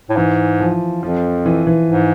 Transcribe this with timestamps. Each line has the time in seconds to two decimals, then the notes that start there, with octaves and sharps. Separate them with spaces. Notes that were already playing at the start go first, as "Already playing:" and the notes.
0.09 A2
0.16 G#2 E3
0.60 F3
1.02 F2 F3
1.46 E3
1.67 E3
1.88 G#2